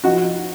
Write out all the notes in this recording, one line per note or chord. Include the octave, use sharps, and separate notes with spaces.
F3 D#4 F#4